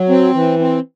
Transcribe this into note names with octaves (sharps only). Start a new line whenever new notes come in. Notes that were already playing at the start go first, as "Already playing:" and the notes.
Already playing: F#3
C4
E3
C4